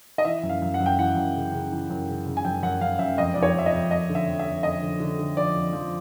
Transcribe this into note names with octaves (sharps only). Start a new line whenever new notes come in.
D#5
E3 E5
F#2
F5
F#2
F#5
F#2
G5
E3 F#5
F#2
C#3
C#3
E3
F#2
C#3
C#3
G#5
F#2 G5
F#2 F#5
F#2 F5
F#2 E5
F2 D#5
F2 D5
C#5
F3 E5
D#5
F2
F2 D#5
D3
E5
F2
E5
F2
F2 D#5
D3
D3
D3
F3 D5
F2
F3